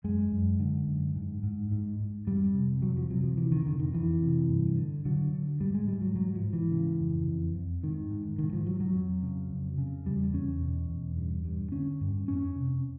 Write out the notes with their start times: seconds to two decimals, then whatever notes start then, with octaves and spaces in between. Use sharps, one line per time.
0.04 F#2 G#3
0.32 F#2
0.60 D3
0.87 F#2
1.15 G#2
1.43 G#2
1.71 G#2
1.99 G#2
2.27 F2 G3
2.54 C3
2.82 F2 F#3
2.97 F3
3.10 C3 F#3
3.23 F3
3.37 C3 E3
3.52 D#3
3.65 F2 D3
3.79 D#3
3.93 F2 E3
4.22 C3
4.49 G2
4.77 D3
5.05 D3 F#3
5.33 D3
5.60 G#2 G3
5.74 G#3
5.88 G#2 G3
6.02 F#3
6.16 G#2 F#3
6.35 F3
6.44 G#2
6.53 E3
6.71 C#3
7.00 F2
7.27 F2
7.55 F2
7.83 G#2 D#3
8.10 G#2
8.38 G#2 D#3
8.53 F3
8.67 G#2 F#3
8.80 F#3
8.94 F2
9.23 C#3
9.50 F2
9.78 C#3
10.05 E2 G3
10.33 E2 C#4
10.61 B2
10.90 E2
11.17 G2
11.44 G2
11.72 D3 C#4
12.01 G2
12.28 F2 C#4
12.56 C3